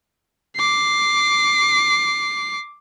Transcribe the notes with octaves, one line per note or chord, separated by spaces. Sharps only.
D6 C7